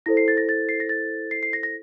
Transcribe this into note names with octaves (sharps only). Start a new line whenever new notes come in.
E4 A4 C5 A#6
C7
A6
A#6
A6
C7
A#6
A6
C7
C7
A#6
A#6